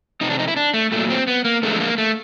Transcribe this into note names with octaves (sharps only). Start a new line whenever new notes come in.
F2 C3 D#4
D4
D#4
E4
D4
A3
A#2 F#3 A3
C4
B3
A#3
F2 D3 F3 G#3 A3
A#3
A3